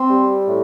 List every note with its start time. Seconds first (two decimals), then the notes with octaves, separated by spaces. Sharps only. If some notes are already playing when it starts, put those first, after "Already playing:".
Already playing: C4
0.10 G3
0.47 A2